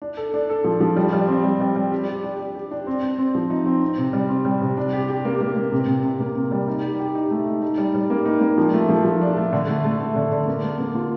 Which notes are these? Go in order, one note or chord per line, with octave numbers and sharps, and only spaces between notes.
D4
A4
D4
A4
F3
F3
G3
G3
C4
G3
G3
G3
G4
G4
D4
D4
G4
D4
C4
C4
C4
F3
D#4
C4
C4
C3
G3
C4
G3
C3
D4
G4
G4
A#3
A#3
A#3
C3
C3
C3
A#3
C3
G3
D#4
G4
G4
D#4
A3
D#4
D#4
G3
G3
A#3
D#4
A#3
F3
A3
F3
F3
D4
A3
D3
A3
A3
A3
D3
D3
A#3
A#3
A#3
F4